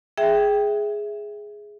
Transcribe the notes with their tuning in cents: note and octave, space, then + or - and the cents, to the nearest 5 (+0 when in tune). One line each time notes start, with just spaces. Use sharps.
G#4 +0 E5 +0 G5 +0